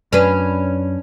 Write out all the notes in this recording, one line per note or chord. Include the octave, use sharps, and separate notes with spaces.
F#2 C#4 D4 B4